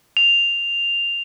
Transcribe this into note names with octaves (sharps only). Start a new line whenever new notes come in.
F7